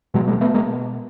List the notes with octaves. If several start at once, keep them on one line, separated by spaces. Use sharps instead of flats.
B2 F#3 G#3
G3 A3
B2 A3 B3
G#3 A#3